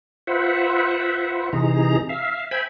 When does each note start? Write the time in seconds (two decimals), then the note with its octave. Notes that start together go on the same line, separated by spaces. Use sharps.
0.27 F4 B4 C5 E5 F#5
1.53 C3 E3 D#4 G#4 A#5
2.09 E5 F5
2.51 C5 E5 G5 G#5 B5